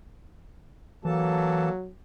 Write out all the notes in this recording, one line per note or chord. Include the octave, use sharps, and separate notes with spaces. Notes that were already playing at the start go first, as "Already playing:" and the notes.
E3 F#3 A#3 A4 A5